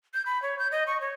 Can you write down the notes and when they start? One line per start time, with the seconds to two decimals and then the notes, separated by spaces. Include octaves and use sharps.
0.14 G6
0.26 B5
0.42 C#5
0.59 G6
0.72 D#5
0.87 C#6
1.01 C#5